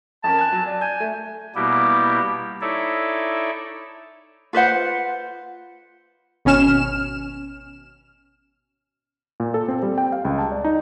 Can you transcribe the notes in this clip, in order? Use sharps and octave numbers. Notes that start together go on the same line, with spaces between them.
F2 C#4 A#4 A5
G#5 F#6
F#3
D5
G#5 G6
A3
B2 G3 A#3 B3 E4 G4
D#4 E4 A4 C#5 D5 E5
F4 B4 C5 F#5
G#1 B2 C#4 F6 E7
A#2
A4
C4
G3
G5
F5
C#2
A5
D5
D#4